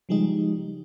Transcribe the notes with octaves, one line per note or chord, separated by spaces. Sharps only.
C#3 F3 G3 G#3 D#4